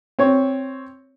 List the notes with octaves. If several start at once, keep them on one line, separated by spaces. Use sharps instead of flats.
C4 C#5